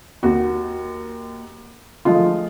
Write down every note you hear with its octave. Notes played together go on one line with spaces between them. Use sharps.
D#2 F#4
F3 G#3 A3 F4